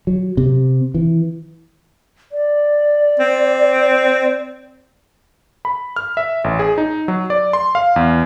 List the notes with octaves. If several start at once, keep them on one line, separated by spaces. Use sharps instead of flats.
F#3
C3
E3
D5
C4
B5
F6
E5
A1
G#4
D#4
F#3
D5
C6
F5
E2